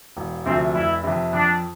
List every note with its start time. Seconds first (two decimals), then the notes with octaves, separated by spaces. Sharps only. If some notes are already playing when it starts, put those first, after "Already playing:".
0.17 E1
0.46 D2 C3 F3 C4
0.75 F1 E4
1.04 F2 C3
1.33 F2 D4